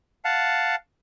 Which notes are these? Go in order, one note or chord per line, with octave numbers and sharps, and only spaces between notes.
F5 F#5 A5